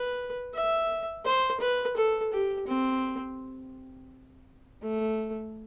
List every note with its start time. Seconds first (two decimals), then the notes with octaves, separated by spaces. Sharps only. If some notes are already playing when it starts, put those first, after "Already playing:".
Already playing: B4
0.54 E5
1.25 C5
1.60 B4
1.97 A4
2.33 G4
2.67 C4
4.82 A3